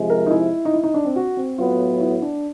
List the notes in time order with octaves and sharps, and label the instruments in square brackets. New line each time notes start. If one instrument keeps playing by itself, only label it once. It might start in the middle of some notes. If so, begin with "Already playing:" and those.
Already playing: [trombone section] C3 F3 G#3
[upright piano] A#4
D#4
E4
D#4
E4
D#4
D4
C4
F#4
C4
[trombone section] A2 F#3 B3 [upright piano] F4
[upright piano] E4
D4